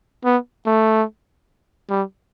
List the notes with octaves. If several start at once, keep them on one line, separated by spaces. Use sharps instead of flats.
B3
A3
G3